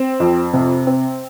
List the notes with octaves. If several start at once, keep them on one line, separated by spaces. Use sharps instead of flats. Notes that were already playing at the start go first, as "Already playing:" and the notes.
Already playing: C4
F2
C3
C4